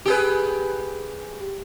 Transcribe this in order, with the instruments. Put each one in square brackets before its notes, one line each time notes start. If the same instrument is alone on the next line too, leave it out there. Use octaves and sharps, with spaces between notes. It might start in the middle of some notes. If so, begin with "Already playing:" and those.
[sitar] G4 G#4 B4